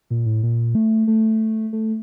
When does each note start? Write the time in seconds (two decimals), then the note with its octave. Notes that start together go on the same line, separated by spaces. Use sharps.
0.10 A#2
0.26 A2
0.43 A#2
0.75 A3
1.08 A3
1.73 A3